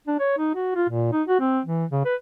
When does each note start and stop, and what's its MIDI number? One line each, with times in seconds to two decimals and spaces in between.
0.07 0.18 62
0.19 0.35 73
0.38 0.52 63
0.55 0.74 66
0.75 0.86 65
0.89 1.12 46
1.12 1.23 63
1.28 1.39 66
1.40 1.61 60
1.66 1.85 52
1.91 2.04 49
2.05 2.15 71